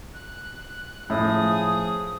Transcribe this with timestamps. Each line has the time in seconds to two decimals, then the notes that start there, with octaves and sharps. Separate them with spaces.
0.14 F#6
1.10 A2 F3 G#4 D#6